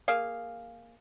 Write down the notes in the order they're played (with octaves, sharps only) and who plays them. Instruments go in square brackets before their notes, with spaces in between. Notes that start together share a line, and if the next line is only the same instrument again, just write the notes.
[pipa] A#3 G#4 F5